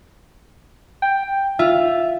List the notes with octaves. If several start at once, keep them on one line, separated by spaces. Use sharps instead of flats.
G5
F4 E5